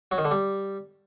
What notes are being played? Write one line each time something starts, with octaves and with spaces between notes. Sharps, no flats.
F#3
D#3
D3
G3